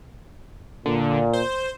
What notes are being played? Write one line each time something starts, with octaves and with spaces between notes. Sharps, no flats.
A#2 D3
C5